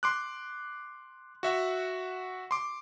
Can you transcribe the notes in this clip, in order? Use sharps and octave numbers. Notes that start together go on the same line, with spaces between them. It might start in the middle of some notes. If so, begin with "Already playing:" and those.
C6 D6 F#6
F#4 E5 F#5
C6 D6